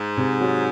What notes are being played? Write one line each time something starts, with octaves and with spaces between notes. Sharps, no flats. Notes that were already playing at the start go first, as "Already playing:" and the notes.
Already playing: G#2
C3
F#3